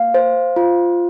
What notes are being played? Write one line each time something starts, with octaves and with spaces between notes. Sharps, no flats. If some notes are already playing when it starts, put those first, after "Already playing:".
Already playing: A#3 F5
C5
F4